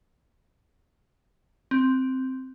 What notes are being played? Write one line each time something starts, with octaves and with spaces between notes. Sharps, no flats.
C4